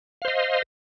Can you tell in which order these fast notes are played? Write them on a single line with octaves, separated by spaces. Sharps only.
F5 C5 D#5